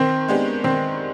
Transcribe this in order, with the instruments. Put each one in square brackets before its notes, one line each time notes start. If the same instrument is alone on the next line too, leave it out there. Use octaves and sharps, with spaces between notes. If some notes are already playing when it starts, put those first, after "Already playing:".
Already playing: [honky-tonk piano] D#3 [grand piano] C4
[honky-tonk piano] G#3 B3 D4 G4
[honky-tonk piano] D#3 [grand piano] C4